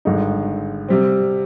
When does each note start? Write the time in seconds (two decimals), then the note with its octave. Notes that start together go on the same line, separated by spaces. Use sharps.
0.05 G#1 G2 D3 G#3 D#4
0.89 C3 G3 C4